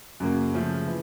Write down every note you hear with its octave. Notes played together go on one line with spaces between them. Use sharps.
F#2 C#3 F#3 A#3
C#3 F3 A3
E3